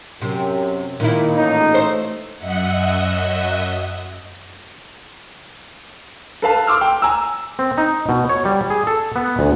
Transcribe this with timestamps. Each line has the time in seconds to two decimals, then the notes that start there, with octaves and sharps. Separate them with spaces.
0.22 F#2 C3
1.00 A#2 D#3 E4
1.36 A1 D#4
1.74 A3 C5
2.38 F#2 D#5 E5 F#5
6.42 A4 B4 F5 A5
6.67 C6 D6 E6 F6
6.81 G5
7.02 G#5 A#5 E6
7.59 C4
7.78 D#4
8.09 B2
8.29 C#5
8.45 G3
8.70 G#4
8.87 A4
9.16 B3
9.39 D2